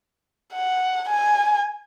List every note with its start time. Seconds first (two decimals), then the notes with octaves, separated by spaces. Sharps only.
0.53 F#5
1.09 G#5